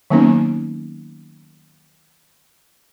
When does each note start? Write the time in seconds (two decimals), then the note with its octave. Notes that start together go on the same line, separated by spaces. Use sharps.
0.10 D#3 F#3 A#3 B3 C#4 D#4